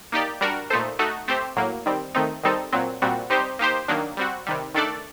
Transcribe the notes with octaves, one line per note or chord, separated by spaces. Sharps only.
A#3 D#4 G4 D5
G3 D4 F#4 A#4
A#2 A3 D#4 A4 C5
A3 D#4 F#4 A4
A3 C4 G4 C5
A2 F#3 A#3
D#3 G3 C4
D#3 A3 C4 D#4
D#3 G3 C4 D#4 A4
A#2 F#3 C4
A#2 G3 C4 F#4
G3 C4 D#4 G4 C5
A#3 D#4 G4 C5
D#3 F#3 A#3 D4
G3 C4 F#4
C3 D#3 G3
D#3 A3 D4 A4 D5